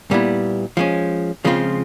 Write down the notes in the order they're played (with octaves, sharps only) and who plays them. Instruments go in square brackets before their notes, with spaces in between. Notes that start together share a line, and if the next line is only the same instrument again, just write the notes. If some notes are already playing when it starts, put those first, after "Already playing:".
[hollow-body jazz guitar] A#2 G3 B3 E4
F3 G#3 C#4
C#3 F3 G#3 C4 F4